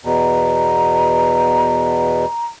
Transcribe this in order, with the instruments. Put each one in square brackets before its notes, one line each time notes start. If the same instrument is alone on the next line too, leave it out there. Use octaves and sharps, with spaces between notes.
[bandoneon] E2 B2 [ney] A#5